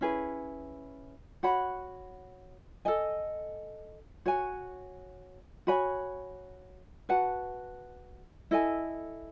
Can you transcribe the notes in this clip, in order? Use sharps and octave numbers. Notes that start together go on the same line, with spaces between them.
C#4 E4 G#4 B4
F#4 C#5 F#5 B5
A4 D#5 G#5
F#4 C#5 G#5
F#4 C#5 G#5 B5
F#4 B4 F#5 A5
E4 A4 D#5 G#5